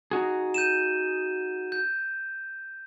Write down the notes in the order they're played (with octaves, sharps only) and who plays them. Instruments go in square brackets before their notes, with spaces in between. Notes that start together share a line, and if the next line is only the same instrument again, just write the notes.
[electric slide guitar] D#4 F#4 G#4
[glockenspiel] G6 D#7 E7
G6